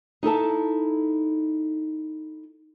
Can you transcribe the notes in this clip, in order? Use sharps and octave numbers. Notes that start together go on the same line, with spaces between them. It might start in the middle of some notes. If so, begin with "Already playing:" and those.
D#4 E4 A4 A5